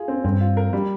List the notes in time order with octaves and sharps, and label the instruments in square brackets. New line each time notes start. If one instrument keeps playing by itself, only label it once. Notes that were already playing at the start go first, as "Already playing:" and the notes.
Already playing: [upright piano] F4 G#4
C4
[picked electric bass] G2 [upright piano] C4
[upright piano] F4
A#4
G3